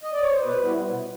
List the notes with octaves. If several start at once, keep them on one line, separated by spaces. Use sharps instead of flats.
D#5
D5
C#5
C5
B2 B4
G3 B3 E4
B2